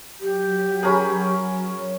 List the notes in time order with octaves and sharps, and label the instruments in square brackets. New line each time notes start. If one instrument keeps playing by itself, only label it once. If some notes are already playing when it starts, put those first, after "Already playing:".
[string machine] F#3 [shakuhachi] G4
[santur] C#4 A#4 [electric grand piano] G#4 A#5 B5